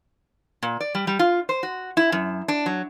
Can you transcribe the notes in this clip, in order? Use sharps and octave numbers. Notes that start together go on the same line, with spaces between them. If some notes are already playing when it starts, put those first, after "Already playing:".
A#2
D5
G3
G3
F4
C5
F#4
E4
F#2
D4
F#3